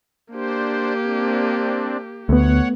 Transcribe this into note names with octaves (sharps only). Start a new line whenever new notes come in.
A#3 D4 G4 C5
C4 D4
D2 A3 B3 C#5 F#5